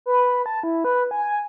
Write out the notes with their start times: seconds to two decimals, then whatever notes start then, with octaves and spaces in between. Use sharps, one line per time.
0.06 B4
0.46 A5
0.63 E4
0.84 B4
1.11 G#5